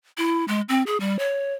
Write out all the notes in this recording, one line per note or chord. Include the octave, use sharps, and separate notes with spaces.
E4
G#3
C4
G#4
G3
C#5